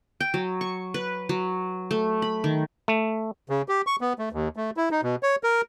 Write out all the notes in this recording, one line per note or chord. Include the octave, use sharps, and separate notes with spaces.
G5
F#3
C#6
B4
F#3
A3
B5
D#3
A3
C#3
G4
C#6
B3
A3
D#2
A3
E4
D#4
B2
C#5
A#4